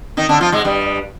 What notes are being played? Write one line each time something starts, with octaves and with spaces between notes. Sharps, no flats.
D#3 D#4
D3 D4
F3 F4
G#2 G#3
G2 G3